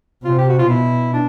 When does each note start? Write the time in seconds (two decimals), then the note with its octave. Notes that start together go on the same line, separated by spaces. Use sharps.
0.24 C3 F4
0.38 G4
0.49 F#4
0.59 F4
0.68 B2 E4
1.13 D4